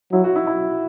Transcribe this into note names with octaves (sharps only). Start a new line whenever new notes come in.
F#3 E4
F#4
E4
E4